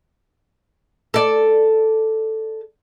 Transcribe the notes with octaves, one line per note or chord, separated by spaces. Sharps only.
A4 D5